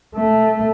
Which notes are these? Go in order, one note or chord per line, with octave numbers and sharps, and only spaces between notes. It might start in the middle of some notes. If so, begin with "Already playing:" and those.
A3